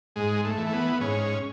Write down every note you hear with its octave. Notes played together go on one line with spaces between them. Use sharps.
G#2 G#3
A3
E3
A3
B3
G#2 C#4